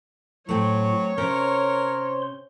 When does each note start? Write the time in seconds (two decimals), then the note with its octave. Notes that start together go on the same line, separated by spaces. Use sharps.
0.49 A2 F#3 A3 C4 C#5 G5
1.18 C3 C#4 A#4 C5 C6